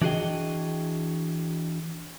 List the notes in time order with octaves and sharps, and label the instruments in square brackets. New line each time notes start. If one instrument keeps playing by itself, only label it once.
[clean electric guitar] E3 D4 F#4 G#4 D#5 G5